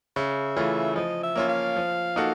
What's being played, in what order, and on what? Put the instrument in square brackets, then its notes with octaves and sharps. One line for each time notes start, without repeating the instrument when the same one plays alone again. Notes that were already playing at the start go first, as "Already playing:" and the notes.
[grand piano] C#3 [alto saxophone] E5
[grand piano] E3 A3 C#4 F4
[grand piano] F3 [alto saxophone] D#5
[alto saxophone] E5
[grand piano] A#3 C#4 F4
[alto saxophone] F5
[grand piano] F3
A#3 D#4 F#4 A4